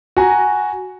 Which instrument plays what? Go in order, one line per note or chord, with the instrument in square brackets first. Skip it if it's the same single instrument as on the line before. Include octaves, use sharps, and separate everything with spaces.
[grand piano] F#4 G#5 A#5